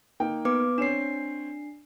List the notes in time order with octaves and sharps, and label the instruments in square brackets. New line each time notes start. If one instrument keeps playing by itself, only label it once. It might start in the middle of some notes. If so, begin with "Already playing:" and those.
[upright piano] A#3 D#4 G5
[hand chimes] B3 B4 D6
[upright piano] C4 C#5 E7 [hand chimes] D4 C7